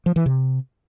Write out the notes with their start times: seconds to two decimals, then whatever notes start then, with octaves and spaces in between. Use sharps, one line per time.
0.06 F3
0.16 E3
0.26 C3